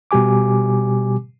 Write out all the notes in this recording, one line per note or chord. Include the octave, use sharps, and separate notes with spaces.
B2 G3 G4 G#5 D6